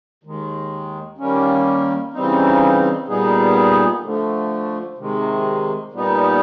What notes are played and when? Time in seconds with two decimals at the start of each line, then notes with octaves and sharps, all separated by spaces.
0.23 D#2 D#3 G#3
1.18 D#3 G3 A#3 C#4
2.13 C#3 E3 G3 C4 D#4
3.07 A#2 G3 B3 D#4 G#4
4.02 D3 F3 A3
4.97 C3 D#3 G#3
5.92 A#2 G3 B3 D#4